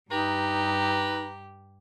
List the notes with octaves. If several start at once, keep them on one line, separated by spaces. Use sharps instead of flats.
G2 D#4 G4 B4 A#5